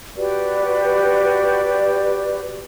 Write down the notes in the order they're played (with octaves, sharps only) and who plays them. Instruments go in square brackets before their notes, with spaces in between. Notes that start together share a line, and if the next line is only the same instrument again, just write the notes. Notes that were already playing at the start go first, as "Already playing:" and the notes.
[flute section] F#4 G4 B4 D5